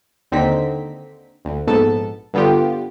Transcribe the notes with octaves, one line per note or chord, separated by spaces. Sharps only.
D#2 D3 C4 D#4 B6
D2
A#1 G#2 B3 A4 A5
G2 D3 B3 F4 G4